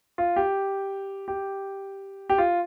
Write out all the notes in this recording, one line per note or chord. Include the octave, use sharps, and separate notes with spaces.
F4
G4
G4
G4
F4